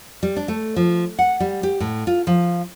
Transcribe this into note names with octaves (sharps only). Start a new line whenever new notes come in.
G3
D4
A3
F3
F#5
G3
G4
A2
F4
F3